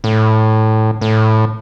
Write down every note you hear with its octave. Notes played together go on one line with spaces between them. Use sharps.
A2
A2